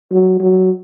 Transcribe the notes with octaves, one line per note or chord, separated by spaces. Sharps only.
F#3
F#3